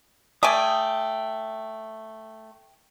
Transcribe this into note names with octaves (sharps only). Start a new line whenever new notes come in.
A3 D5 G5 G#5 D#6